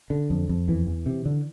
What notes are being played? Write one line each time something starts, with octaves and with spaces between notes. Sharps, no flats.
D3
F2
F2
E2 E3
E2
C3
D3